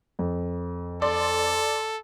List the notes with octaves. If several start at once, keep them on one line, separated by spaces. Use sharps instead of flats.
F2
A4 D5 C6 D6